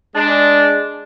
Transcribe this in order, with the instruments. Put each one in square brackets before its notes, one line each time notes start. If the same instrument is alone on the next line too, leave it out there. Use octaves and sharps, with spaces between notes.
[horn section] G#3 D4